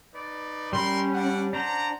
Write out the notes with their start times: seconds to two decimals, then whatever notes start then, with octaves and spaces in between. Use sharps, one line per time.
0.14 D#4 B4 D5
0.73 G3 C#4 A#4 B5 C6
1.14 D4 F#5
1.53 D4 C5 F#5 A#5